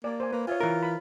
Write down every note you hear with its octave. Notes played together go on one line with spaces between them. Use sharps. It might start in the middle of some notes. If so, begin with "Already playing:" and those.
A#3 D5 G#5
C5 G#5
A#3 B4
F4 C#5 E5 G#5
E3 A#4
B5